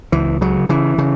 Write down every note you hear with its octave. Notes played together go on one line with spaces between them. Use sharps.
C#2 E3
C#3 F#3
C#3 E3
C#3